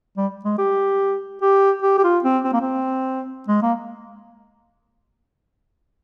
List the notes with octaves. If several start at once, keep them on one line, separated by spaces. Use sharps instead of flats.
G3
G#3
G4
G4
G4
G4
F4
C4
C4
A#3
C4
G#3
A#3